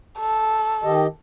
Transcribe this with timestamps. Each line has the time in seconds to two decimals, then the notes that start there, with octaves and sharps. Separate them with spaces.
0.19 A4
0.84 D#3 G4 D#5